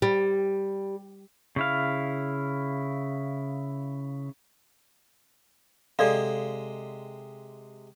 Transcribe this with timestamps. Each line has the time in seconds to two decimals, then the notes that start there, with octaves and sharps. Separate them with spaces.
0.02 G3
1.56 C#3 E4 F5
5.99 C3 G#3 A4 D5 F5